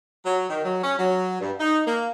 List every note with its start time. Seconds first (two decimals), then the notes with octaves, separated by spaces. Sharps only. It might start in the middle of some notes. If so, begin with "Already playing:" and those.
0.25 F#3
0.50 D#3
0.65 F#3
0.83 C#4
0.98 F#3
1.39 G2
1.60 D#4
1.86 A#3